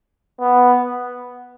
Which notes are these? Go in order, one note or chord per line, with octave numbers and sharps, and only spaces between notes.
B3